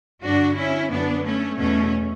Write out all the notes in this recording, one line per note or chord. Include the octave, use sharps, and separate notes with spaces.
G2 D3 D4 F#4
C#4 E4
F#2 D3 B3 D4
A3 C#4
E2 B2 A3 C#4